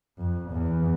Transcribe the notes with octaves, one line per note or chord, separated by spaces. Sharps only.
F2
E2